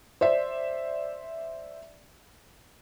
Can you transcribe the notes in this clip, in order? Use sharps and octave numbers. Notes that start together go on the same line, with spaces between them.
C5 D5 E5